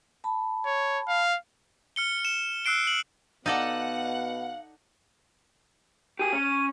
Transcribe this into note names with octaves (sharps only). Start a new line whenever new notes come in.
A5 B5
C#5
F5
F6 C#7 G7
E7
E6 F#6 C7 D7 G7
F#7
B2 B3 D#4 A4 D5 F5 F#5
G4 G#4 D#7
C#4